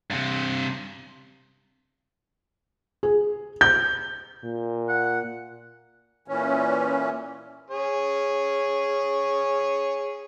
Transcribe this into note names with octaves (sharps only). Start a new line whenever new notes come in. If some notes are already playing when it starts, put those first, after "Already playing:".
G2 C3
G#4
G6
A#2
F#5
A#2 E3 C#4
G#4 C#5